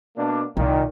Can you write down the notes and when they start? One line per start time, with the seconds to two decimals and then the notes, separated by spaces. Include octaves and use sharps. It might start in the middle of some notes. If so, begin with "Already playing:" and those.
0.17 B2 A#3 D4
0.57 C2 A#2 D#3